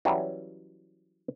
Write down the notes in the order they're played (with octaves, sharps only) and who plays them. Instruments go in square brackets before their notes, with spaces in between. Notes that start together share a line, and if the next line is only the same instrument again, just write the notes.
[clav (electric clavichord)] E3 F#3 G3 C#4